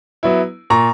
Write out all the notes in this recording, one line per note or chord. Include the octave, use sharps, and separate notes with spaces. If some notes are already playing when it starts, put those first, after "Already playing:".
F#3 B3 E4
A#2 A#5 C#6